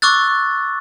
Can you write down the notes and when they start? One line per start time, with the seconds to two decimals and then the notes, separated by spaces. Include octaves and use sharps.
0.02 C#6 D6 E6 F#6 A6